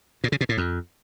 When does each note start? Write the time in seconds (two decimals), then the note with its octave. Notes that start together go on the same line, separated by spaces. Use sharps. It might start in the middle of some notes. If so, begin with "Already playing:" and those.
0.24 A#2
0.32 C#3
0.41 B2
0.49 A2
0.58 F2